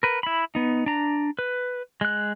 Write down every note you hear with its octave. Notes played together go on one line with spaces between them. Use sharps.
A#4 B4
E4 B5
B3 D#4
D4 A#5
B4
G#3 F#6